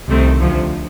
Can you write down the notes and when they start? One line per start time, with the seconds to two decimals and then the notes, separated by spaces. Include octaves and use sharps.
0.08 C2 C3 D#3 A3 C4
0.40 D2 C3 F3